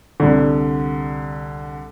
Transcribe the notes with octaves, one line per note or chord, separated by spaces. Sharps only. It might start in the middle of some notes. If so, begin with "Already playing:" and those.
C2 D3